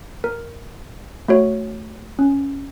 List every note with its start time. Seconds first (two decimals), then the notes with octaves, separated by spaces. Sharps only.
0.24 A#4
1.28 A3 F#4 C#5
2.19 C#4